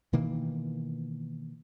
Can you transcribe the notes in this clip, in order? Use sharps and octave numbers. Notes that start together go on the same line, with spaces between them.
B2 D#3 E3 A#3